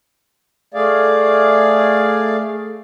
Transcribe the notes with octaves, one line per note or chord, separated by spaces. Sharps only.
A3 G#4 D5 F5